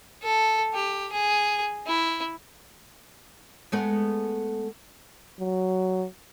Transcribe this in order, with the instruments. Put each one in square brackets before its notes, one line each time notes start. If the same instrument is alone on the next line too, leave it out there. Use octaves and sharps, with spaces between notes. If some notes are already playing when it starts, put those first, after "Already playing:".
[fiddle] A4
G4
G#4
E4
[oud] G#3 A3 B3
[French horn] F#3